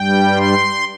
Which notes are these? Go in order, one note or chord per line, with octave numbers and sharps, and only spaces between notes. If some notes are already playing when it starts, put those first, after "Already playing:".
Already playing: G2 G3 G5
C6